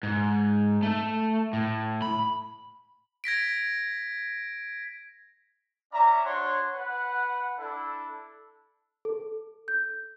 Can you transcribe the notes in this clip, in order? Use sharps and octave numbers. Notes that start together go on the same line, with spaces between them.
G#2
A3
A2
B5
G#6 A#6 B6 D7
C#4 D5 E5 A#5
D4 F#4 C5 C#5 C6
B4 F#5
D4 E4 A4
A4
G6